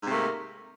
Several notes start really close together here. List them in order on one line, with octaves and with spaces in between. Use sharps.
G#2 C3 A3 A#3